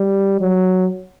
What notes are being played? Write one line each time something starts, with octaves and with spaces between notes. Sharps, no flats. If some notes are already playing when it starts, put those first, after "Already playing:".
Already playing: G3
F#3